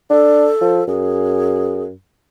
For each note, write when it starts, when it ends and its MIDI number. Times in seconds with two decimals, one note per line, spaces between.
0.10 0.48 62
0.10 0.84 69
0.61 0.82 53
0.88 1.93 42
0.88 1.84 68